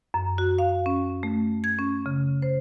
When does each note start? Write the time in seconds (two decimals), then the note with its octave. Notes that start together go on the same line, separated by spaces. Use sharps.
0.14 F#2
0.38 F#4
0.58 F5
0.86 C#4
1.23 A3
1.64 G#6
1.78 C#4
2.06 C#3
2.42 C5